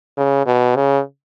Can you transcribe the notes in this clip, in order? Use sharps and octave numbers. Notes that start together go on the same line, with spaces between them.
C#3
B2
C#3